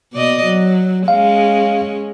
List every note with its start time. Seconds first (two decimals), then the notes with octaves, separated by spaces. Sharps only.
0.13 B2 D5 D#5
0.44 F#3
1.08 G#3 C#4 F5